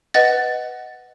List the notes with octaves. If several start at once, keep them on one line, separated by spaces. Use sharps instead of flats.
B4 D#5 F#5 A6